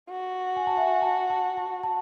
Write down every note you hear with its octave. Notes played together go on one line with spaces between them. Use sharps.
F#4
G#5
A5
E5 G#5
A5
A5
A5
A5